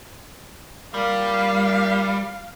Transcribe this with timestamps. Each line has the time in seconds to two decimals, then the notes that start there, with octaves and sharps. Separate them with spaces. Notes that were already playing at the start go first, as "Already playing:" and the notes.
0.94 A#2 G3 F5